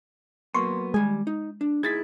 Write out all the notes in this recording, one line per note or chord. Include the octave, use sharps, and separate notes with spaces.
F#3 A#3 B3 C6 C#6
D#2 G3 G#3 G#5
D#4
D4
D#4 E4 G#4 G#6 A6 B6